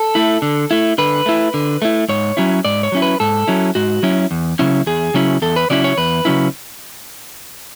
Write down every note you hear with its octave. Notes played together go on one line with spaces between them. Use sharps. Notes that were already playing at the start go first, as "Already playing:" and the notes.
Already playing: A4
A3 E4
D3
A3 E4
D3 B4
A3 E4
D3
A3 E4
G#2 C#5
F#3 C#4 E4
G#2 D5
C#5
F#3 C#4 E4
B4
G#2 A4
F#3 C#4 E4
G#2 F#4
F#3 C#4 E4
E2
C#3 F#3 C#4 E4
E2 G#4
C#3 F#3 C#4 E4
E2 A4
B4
C#3 F#3 C#4 E4 D5
C#5
E2 B4
C#3 F#3 C#4 E4